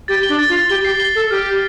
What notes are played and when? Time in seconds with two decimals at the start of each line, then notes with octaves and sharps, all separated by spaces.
0.08 G4 A6
0.23 G7
0.29 D4
0.39 A6
0.49 F4
0.54 A6
0.69 G4 G7
0.85 G4 C7
1.00 G7
1.15 A4 G7
1.31 G4 F6
1.46 F6